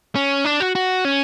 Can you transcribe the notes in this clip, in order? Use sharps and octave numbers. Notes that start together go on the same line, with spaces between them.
C#4
D4
F#4
F#4
C#4